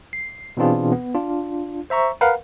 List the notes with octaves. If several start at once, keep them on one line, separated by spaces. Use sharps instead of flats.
C7
B2 E3 C4 D4 F4 G#4
B3
D4 F4
C5 E5 A#5 C#6
A#4 B4 F5 F#5